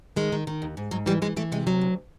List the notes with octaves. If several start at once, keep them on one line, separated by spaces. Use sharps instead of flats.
D#3 G#3
D#3
D#3
D#2
G#2
G#2 F#3
E3 G3
E3 G#3
E3 A3
C3 G#3
D2 F#3
D2